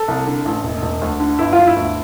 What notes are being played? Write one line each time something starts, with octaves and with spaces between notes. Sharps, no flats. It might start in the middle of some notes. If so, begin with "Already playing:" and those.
Already playing: A4
C2
D3
A1
E1
E1
D2
D3
G1 E4
F4
G1
E4
D2